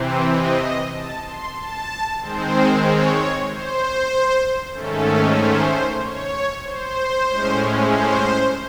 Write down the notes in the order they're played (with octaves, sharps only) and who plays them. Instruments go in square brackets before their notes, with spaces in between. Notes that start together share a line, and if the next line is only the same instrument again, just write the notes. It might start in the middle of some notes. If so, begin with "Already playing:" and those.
Already playing: [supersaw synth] C3 E3 C4
D#5
A5
C6
A5
D#3 G#3 C4 C5
C#5
C5
G#2 D#3 A3 C#4 A4
C5
C#5
C5
A2 G#3 C#4
C5